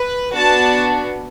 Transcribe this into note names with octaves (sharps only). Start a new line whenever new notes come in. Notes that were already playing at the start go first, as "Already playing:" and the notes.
Already playing: B4
B3 D4 F#4 A5